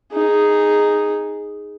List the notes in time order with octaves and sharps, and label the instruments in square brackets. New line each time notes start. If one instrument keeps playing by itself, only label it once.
[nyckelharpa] D#4 G#4